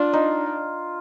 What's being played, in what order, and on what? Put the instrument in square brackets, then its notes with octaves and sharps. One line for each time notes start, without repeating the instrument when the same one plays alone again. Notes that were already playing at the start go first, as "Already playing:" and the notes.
Already playing: [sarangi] D4 [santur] F4
[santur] D#4